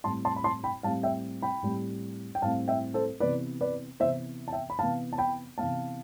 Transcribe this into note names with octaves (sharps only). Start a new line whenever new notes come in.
A2 G3 C4 A5 C6
A5 C6
B5
A5 C6
G5 B5
A2 G3 C4 F5 A5
E5 G5
G5 B5
A2 G3 C4
G5
A2 G3 C4 F5 A5
E5 G5
A4 C5
C3 E3 B3 B4 D5
B4 D5
C3 E3 B3 C5 E5
A5
E5 G5
B5
C3 E3 B3 F5 A5
A5
G5 B5
C3 E3 B3 F5 A5